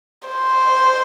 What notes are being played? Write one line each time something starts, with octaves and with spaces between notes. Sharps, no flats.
C5